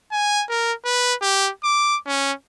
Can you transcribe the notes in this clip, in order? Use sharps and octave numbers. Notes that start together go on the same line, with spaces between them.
G#5
A#4
B4
G4
D6
C#4